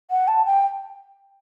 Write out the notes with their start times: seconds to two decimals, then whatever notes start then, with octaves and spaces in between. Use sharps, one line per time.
0.11 F#5
0.28 A5
0.46 G5